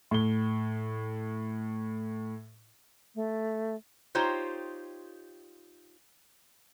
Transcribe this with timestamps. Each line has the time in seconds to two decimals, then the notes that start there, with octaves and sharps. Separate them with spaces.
0.11 A2 G7
3.15 A3
4.15 D#4 F4 G4 C5 C#5